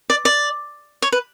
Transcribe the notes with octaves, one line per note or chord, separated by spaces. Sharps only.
D5
D5
C#5
B4